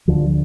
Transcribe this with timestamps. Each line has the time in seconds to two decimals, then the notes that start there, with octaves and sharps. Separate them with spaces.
0.08 D2 D3 F3